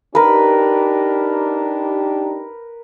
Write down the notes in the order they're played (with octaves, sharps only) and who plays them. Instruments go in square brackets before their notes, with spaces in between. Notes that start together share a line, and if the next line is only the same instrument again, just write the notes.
[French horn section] D4 D#4 G4 [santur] A#4 B4